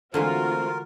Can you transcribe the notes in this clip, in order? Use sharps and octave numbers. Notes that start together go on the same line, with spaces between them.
D3 E3 G#3 A3 C4 F4 F#4 A#4